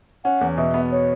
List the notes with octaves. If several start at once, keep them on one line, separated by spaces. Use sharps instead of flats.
C#4 F#5
E2
B2 E5
B3
C#5